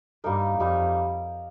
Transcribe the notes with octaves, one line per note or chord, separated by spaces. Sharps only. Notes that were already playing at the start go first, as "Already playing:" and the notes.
G2 G3 A#3 D#4 A#4
F2 G3 A#3 D#4 A#4